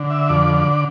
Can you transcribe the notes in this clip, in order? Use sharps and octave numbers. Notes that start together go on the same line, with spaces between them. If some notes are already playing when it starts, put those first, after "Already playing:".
Already playing: D3
E5
F2 D5
D5
D5